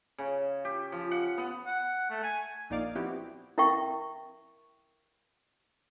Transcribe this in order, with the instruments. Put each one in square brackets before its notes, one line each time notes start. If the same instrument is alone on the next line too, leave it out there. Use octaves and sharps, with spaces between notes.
[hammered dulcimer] C#3
G4
F3
F#5
B3
[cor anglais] F#5
A3
G#5
[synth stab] A#1 A#2 D#4 D5 F5 D6
F3 B3 C4 E4 F#4 G4
[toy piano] E4 A#4 E5 G5 C#6